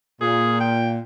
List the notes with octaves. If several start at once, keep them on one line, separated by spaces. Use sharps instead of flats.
A#2 G#4
G5